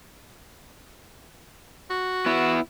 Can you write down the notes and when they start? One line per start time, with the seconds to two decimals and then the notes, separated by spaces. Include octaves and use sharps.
1.90 F#4
2.26 B3 E4